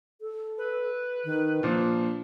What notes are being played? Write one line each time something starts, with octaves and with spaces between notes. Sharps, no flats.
A4
B4
D#3
A#2 F3 D4